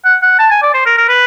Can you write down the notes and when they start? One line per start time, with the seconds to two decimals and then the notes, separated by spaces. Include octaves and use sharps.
0.05 F#5
0.22 F#5
0.39 A5
0.51 G#5
0.62 D5
0.74 C5
0.86 A#4
0.98 A#4
1.08 B4